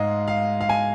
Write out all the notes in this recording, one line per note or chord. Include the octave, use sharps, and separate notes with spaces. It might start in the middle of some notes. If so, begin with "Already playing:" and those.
Already playing: G#2 G#3 D#5 F5
F5
F5
G#5